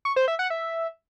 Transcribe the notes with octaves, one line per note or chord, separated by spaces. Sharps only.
C#6
C5
E5
F#5
E5